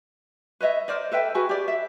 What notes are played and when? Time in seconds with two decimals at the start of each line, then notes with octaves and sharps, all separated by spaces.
0.60 B4 C#5 D#5 E5
0.88 A#4 C5 D5 D#5
1.12 A4 B4 E5 G5
1.35 F#4 G#4 B4 G#5
1.49 G4 D5
1.68 E5